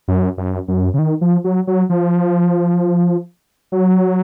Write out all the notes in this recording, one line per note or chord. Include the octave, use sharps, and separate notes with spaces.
F#2
F#2
F#2
C#3
D#3
F3
F#3
F#3
F3
F#3